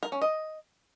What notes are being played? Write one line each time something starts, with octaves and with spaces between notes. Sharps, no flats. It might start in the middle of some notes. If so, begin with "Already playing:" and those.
A#4
C#4
D#5